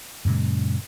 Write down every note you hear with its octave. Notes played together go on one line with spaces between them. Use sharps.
F#2 A#2 C#3 G#3